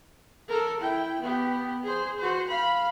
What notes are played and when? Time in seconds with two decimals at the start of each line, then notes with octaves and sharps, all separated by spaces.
0.48 A4 A#4
0.80 E4 G5
1.20 B3 G4
1.84 G#4 C5
2.18 F#4 C5
2.47 F5 B5